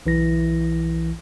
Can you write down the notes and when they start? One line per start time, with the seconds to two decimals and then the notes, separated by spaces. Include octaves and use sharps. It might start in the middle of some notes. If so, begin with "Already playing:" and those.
0.06 B1 E3 E4 A#6